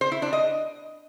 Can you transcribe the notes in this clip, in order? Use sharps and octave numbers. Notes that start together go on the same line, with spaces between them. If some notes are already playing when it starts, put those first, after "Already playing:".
C5
E4
D4
D#5